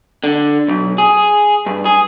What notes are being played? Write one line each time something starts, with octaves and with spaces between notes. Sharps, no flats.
D3
B1
G#4
G2
G#4